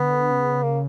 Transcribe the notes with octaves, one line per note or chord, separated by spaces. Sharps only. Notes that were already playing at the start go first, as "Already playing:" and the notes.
Already playing: D3 B3
C#3
A#3